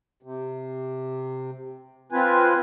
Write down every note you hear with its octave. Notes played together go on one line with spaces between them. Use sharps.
C3
C4 F4 B4 G#5